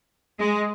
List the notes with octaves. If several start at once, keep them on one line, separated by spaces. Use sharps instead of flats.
G#3